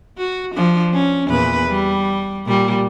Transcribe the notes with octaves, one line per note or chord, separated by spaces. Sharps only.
F#4
F3 D4
C#4
E2 A#2 B4
G3
A#2 G3